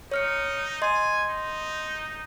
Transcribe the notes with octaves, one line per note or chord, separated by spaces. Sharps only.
D#4 C#5 F6 C#7
D#5 G#5 C6
D#4